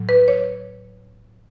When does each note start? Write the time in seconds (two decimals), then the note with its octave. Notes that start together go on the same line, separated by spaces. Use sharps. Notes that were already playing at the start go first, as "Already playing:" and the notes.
Already playing: A2 F#3
0.09 B4
0.28 C#5